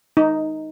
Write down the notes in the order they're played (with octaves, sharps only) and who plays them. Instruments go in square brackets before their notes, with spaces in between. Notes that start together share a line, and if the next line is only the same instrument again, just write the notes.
[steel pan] D#4